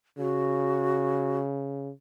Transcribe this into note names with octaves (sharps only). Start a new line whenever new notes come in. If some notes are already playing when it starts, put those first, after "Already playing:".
C#3 F#4